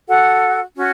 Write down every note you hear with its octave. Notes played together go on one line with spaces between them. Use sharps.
F#4 A4 F#5
C#4 F#4